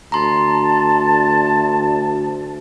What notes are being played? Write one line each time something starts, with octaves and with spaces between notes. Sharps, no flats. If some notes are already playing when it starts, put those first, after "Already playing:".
D2 A5 A#5 C6